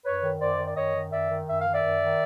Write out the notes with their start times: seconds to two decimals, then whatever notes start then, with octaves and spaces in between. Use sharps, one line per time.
0.05 F#2 B4 C#5
0.23 D#3
0.41 F#2 C5 D5
0.59 D#3
0.66 D5
0.76 F#2 C#5 D#5
0.94 D#3
1.12 F#2 D5 E5
1.30 D#3
1.48 F#2 E5
1.61 F5
1.66 D#3
1.74 D5 E5
1.83 F#2
2.01 D#3